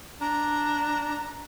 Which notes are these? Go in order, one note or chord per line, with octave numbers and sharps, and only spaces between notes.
D4 A#5